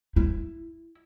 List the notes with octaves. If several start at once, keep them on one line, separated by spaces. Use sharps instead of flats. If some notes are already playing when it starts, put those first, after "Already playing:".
E4